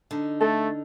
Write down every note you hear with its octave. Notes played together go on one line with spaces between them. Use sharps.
D3 D#4
A3 A4